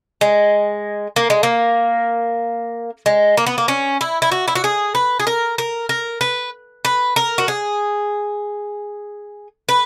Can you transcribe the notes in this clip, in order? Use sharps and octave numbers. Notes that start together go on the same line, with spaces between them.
G#3
A#3
G#3
A#3
G#3
A#3
B3
A#3
C#4
E4
E4
F#4
E4
F#4
G#4
B4
G#4
A#4
A#4
A#4
B4
B4
A#4
F#4
G#4
B4